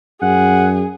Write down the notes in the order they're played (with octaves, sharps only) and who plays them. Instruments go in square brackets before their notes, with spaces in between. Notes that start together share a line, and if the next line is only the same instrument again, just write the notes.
[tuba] F#2 [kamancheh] G#4 [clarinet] F#5